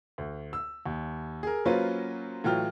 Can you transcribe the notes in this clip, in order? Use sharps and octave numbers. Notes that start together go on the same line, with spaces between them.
D2
E6
D#2
G#4 A#4
F#3 A#3 C#4 F4 B4 C5
A2 E3 F#3 F4 G5 F6